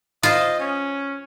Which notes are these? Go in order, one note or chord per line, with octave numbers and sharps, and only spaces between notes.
F4 C5 D#5
C#4